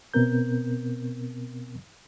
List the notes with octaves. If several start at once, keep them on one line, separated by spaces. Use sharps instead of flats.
B2 B3 C4 A#4 G6